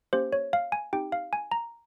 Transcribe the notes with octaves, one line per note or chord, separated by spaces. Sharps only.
A#3 C#4 G4 C5
C#5
F5
G#5
C4 D#4 G4 G5
F5
G#5
A#5